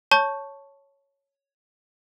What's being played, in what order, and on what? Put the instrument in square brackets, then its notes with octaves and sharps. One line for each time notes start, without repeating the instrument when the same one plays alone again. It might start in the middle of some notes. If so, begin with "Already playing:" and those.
[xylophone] C#5 A5 C#6 G6